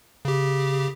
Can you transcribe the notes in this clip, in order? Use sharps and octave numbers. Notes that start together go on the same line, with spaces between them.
C#3 G4